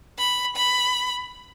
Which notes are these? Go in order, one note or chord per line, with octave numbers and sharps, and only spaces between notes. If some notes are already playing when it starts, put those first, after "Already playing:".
B5
B5